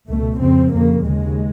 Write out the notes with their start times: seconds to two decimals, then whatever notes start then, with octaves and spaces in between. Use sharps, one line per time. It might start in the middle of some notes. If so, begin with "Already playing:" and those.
0.08 C#2 B2 A3
0.40 F2 C#3 C4
0.72 F2 C#3 A#3
1.04 D#2 C#3 G#3